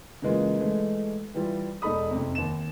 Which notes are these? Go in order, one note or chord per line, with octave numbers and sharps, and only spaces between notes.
C#3 E3 G#3 A#3 F4
E3 G#3 A3
E3 G3 E4 F4
E1 D#4 A4 B5 D#6
F2 C3
D#2 E7